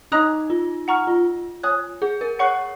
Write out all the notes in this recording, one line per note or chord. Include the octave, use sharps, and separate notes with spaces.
D#4 D#5 A#5 D#6 F#6
F4
F#5 A#5 C#6 F6
F4
C#5 G#5 D#6 F#6
G#4
A#4
C#5 F#5 C#6 F#6